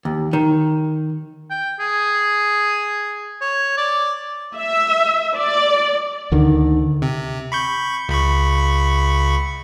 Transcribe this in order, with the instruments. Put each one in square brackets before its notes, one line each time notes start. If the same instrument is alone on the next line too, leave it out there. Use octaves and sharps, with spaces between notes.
[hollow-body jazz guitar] D#2
D#3
[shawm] G5
G#4
C#5
D5
[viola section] E5
D5
[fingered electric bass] D2 D3 D#3
[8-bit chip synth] C3
B5 C#6 G6
C#2 B5 C#6